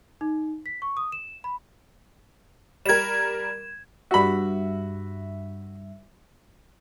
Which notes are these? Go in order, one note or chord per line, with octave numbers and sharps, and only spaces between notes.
D#4
B6
C#6
D#6
E7
B5
G3 A#4 G#6 E7
G2 F#4 E5 B5